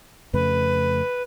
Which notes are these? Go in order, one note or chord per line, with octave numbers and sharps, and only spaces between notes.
F2 C#3 A3 B4